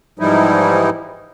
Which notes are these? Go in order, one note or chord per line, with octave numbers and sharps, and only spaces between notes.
G#2 E3 F3 G3 D#4 E4